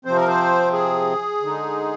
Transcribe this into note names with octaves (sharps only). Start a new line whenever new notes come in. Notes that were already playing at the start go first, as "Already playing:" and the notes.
C3 F3 C4 C5
A#4
C5
G#4
D3 G#3 D#4